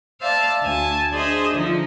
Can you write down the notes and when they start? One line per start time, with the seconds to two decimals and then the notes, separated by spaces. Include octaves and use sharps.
0.21 C5 D5 E5 F5 A5
0.62 D2 G#5 A5
1.12 D4 G#4 C5 D#5 E5
1.55 D3 F3 D#4